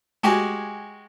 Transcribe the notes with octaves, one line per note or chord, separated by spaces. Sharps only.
G#3 F#4 G4 G#5